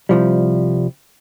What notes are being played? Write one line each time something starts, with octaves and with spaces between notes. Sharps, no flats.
C2 F3 G3